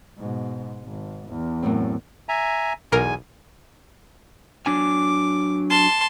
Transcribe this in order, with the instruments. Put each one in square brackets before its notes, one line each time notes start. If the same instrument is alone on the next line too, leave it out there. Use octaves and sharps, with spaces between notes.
[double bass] G#2 B2
G#1
E2
[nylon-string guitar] F#2 A2 C4
[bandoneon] E5 G#5 A#5
[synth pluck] B1 A#4 [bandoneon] E2 G#5
[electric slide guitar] F#3 D4 G#5 [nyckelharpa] D6
[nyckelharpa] A5 C6